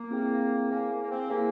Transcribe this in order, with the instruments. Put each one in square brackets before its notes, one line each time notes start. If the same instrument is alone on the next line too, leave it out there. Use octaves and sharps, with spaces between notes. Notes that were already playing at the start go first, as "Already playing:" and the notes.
Already playing: [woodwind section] A#3
[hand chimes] C4 E4 G#4 C5 G5
[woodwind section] A#3 [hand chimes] E4 G#4 C5 F5 G#5
[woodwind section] A#3
A#3
C4
[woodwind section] A#3 [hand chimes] E4 G#4 C5 F5 G#5